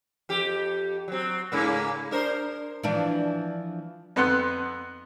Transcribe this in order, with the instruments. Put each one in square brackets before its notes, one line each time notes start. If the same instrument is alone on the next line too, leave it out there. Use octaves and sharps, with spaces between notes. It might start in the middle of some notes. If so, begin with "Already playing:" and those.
[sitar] F2 G4
F#3 C4
G#2 C#3 A#3
D4 A#4 C5
[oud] E3 F3 D4
[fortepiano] F2 B3 F#5 C6 F#6